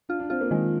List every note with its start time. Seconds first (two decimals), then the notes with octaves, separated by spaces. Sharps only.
0.09 D4 F4
0.20 D4
0.30 C4 F4
0.41 A#3
0.51 D#3 G#3